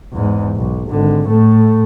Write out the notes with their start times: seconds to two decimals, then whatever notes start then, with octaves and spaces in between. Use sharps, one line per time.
0.12 E2 G#2
0.55 B1
0.89 G#1 D3
1.27 A2 A3